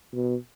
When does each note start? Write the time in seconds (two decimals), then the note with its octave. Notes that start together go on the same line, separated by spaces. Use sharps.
0.13 B2